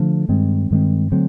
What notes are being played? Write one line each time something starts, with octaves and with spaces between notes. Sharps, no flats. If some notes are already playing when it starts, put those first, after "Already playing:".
Already playing: D3 F3 A3 D4
G2 D#3 G#3 C4
G2 D#3 G#3 C4
D3 F#3 A3 C4